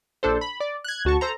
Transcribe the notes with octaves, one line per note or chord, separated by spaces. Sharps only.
A#1 D4 A4 C5
B5
D5
F#6 G#6
D2 F#4 A5 C#6
A4 C5 A#5